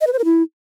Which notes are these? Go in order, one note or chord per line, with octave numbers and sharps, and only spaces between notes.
D#5
B4
C5
A#4
E4